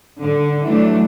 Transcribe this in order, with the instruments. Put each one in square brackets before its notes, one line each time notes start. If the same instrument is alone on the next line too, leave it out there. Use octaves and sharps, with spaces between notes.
[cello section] D3
E3 F#3 A3 D4